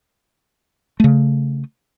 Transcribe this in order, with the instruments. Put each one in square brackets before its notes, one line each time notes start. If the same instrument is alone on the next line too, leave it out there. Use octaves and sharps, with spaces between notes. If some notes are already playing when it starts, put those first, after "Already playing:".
[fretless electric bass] C#3 A3